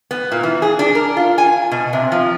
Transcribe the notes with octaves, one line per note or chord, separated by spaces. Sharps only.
B3
A#2
E3
G#4
D4
A#4
F4
G#5
B2
C3
F3